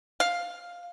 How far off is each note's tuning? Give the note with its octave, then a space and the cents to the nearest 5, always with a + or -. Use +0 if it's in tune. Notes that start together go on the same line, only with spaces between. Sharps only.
F5 +5